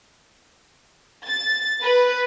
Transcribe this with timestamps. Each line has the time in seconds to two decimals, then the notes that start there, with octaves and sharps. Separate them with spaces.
1.26 A6
1.83 B4